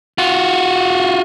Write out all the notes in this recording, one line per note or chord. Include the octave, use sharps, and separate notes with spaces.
F4 F#4